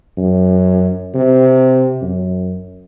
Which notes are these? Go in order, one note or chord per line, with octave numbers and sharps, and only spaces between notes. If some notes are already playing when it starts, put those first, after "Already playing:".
F#2
C3
F#2